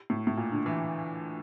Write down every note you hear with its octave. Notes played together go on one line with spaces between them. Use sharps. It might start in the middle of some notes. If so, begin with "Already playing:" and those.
A2
A2
A#2
D3
E3